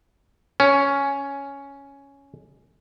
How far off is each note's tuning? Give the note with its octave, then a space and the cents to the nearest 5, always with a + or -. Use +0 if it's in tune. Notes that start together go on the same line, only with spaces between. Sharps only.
C#4 +5